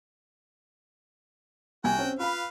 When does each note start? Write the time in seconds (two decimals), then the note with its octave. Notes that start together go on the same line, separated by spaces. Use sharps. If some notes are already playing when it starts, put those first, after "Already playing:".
1.84 C2 F#4 G5 G#5
1.99 C4 C#4
2.19 F4 B4 F5 B5